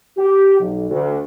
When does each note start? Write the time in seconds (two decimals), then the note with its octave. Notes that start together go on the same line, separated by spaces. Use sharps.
0.17 G4
0.60 B1
0.90 D2